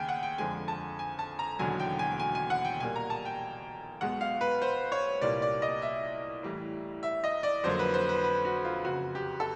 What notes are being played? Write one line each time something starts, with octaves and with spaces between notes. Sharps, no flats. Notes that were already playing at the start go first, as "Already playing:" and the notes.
Already playing: D#2 C#3 G5 G#5
F#5
G5
F2 D3 F3 G#3 G#5
A5
G#5
A5
A#5
E1 D#2 D3 F#3 G#5
G5
G#5
G#5
G#5
F#5
G5
B1 A#2 G3 A#3 G#5
A#5
A5
G5
B1 B2 G#3 F#5
F5
B4
C5
C#5
C2 A#2 G3 A#3 D5
D5
D#5
E5
A1 A2 E3 G3
E5
D#5
D5
F2 D3 F#3 A#3 C5
B4
C5
B4
B4
F#4
F4
F#1 F2 C#3 F#4
G4
A4